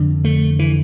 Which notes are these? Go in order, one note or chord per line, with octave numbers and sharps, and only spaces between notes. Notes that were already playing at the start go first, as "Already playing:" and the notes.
Already playing: F2 D3
A3
E3